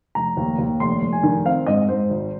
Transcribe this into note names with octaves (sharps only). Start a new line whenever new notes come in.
F1 A#5
D#2
D#2
F1 C6
F1
G#5
D#3
C4 F5
G#2 D#5
G#2 C5
G#1